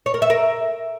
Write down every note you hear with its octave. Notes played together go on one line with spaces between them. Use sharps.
C#5
A#4
E5
A#4